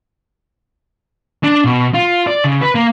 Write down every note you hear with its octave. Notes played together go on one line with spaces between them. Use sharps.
D4
B2
F4
D5
C#3
B4
A#3